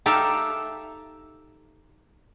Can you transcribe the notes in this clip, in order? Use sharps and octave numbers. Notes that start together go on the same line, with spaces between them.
D#4 G4 A4 E5 F5